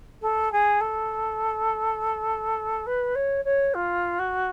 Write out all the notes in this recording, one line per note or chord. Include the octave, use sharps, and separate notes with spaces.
A4
G#4
A4
B4
C#5
C#5
F4
F#4